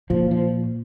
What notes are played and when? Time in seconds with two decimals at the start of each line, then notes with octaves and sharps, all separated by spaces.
0.10 A#2 F3
0.31 F3